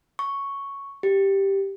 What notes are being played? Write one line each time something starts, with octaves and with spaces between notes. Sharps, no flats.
C#6
G4